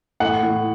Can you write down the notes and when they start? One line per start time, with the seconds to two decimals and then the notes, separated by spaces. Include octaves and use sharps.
0.20 A2 F#5
0.43 A2